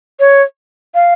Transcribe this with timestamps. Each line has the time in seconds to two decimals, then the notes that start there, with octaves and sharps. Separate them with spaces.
0.20 C#5
0.95 F5